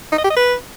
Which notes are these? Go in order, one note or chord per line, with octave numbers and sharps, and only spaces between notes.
D#4
D#5
G4
D#5
B4